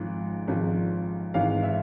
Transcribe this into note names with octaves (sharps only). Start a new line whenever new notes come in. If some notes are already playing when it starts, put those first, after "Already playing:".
Already playing: G#1 G#2 F3
G#1 G#2 F3
G#1 G#2 E3 F5
E5